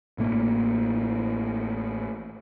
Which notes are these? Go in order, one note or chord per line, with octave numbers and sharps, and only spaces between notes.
A1 A2 A3 A#3